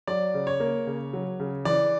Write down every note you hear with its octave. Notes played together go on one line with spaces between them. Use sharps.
F#3 D5
C#3
C#5
A#3
C#3
F#3
C#3
E3 D5